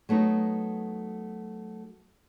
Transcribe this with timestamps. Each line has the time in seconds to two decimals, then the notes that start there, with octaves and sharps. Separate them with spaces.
0.09 F#3 A3 B3 D#4